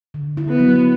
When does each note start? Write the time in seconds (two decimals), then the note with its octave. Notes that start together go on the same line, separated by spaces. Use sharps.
0.14 D3
0.37 E4
0.48 B3
0.60 F#3